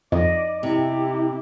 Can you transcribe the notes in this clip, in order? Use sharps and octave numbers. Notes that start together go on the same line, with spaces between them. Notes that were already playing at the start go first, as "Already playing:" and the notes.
F2 D5 D#5
C3 E4 G4